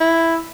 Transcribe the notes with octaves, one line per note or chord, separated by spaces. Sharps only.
E4